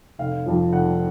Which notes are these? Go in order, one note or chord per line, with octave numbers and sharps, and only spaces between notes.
F1 F5
F2 F3
F1 F#5